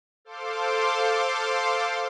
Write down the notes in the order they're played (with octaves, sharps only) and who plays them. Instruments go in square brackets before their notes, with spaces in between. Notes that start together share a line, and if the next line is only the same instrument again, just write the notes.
[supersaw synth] A4 C5 F5 C6 D6